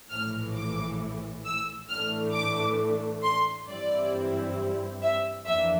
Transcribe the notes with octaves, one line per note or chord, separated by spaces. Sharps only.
A#1 A2 E3 F6
D6
E6
A2 E3 A3 D4 F6
D6
C6
G2 E3 G3 C4 E4 D5
E5
F2 E3 A#3 D4 E5